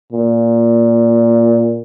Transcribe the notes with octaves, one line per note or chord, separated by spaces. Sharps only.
A#2